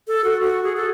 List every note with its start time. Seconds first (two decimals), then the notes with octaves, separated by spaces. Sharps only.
0.07 A4
0.24 F#4
0.41 F#4
0.63 G#4
0.77 A4